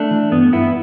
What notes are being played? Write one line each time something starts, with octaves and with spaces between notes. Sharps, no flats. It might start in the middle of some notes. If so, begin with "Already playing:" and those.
Already playing: A3 D4
E3
G2 B3
G2 B3 E4